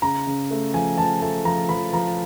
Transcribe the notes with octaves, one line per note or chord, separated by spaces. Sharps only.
C#3 A#5
C#3
A3
F3 G#5
F3 A5
A3 A5
F3 A#5
F3 B5
F3 A#5